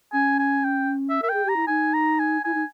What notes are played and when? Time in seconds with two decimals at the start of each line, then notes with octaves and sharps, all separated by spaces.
0.13 C#4 G#5
0.39 G#5
0.65 G5
1.10 E5
1.22 A#4 E5
1.29 G#4 G5
1.45 G4 A#5
1.56 E4
1.67 D#4 G#5
1.94 A#5
2.19 G#5
2.44 E4 G#5
2.54 D#4